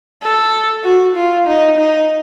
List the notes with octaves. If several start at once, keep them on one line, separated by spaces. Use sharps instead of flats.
A4
F#4
F4
D#4
D#4